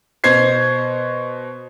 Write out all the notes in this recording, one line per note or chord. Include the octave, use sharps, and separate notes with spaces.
B2 C5 G#6 C7